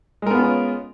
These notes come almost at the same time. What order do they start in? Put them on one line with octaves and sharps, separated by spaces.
G#3 A#4 B3 F4 C#4